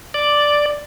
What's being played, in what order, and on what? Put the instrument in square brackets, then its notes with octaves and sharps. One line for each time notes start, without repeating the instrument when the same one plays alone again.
[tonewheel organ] D5